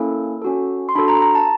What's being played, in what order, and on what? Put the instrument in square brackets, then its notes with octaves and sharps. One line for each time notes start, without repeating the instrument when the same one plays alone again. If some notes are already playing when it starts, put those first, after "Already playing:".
Already playing: [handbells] A#3 C#4 E4 A4
C#4 F#4 A4
C6
D4 F#4 A4 B5
A#5
A#5
A5